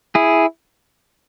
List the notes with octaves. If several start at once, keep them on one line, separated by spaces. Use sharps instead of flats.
E4 G#4